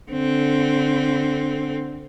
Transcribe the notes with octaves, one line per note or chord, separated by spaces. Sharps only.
D3 C4